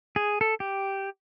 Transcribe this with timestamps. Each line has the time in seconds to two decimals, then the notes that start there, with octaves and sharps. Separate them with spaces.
0.16 G#4
0.41 A4
0.60 G4